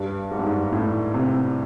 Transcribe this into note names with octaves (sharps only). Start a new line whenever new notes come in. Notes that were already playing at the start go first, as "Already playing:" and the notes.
Already playing: G2
G#2
G2
G#2
A2
C3